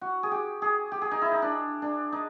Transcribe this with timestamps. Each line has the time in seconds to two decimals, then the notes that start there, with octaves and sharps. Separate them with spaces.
0.01 F#4
0.23 G#4
0.32 G4
0.62 G#4
0.92 G4
1.02 G#4
1.11 D#4
1.22 E4
1.32 D#4
1.42 D4
1.82 D4
2.12 D#4